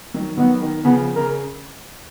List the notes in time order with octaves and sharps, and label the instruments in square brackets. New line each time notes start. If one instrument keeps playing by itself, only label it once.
[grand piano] D#3 F#3
[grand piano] D#3 F#3 [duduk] B3
[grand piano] D#3
[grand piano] C#3 F3 [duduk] B3
[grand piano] C#3 [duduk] A#4